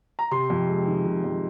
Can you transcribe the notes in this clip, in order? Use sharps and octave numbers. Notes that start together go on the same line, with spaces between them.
A#5
C3 C6
F2
G#3
D#3
C3
F2